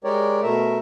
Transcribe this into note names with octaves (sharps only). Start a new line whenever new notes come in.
G#3 G4 A#4 C#5 D5
B2 A3 A#4 E5